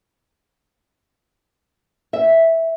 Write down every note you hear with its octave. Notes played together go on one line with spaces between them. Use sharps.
E5